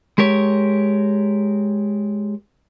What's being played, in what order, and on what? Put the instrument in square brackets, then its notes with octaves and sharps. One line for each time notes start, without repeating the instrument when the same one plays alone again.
[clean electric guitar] G#3 G4 A#4 C#5